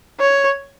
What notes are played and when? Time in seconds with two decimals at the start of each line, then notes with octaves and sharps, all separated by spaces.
0.20 C#5